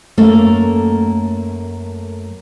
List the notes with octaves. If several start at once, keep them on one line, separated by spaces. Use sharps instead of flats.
F#2 A3 A#3 A4 F5